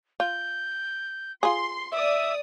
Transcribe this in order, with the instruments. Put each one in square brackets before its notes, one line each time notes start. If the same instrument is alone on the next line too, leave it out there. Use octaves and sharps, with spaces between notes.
[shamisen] F4 [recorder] G6
[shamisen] F4 G#4 [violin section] C6
[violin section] D5 D#6 [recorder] E5